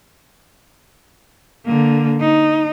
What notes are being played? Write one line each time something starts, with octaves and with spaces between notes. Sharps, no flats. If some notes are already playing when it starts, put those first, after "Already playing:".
D3 A#3
D#4